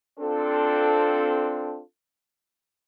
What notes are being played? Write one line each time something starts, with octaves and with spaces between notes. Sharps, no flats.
C4 D4 F4 A4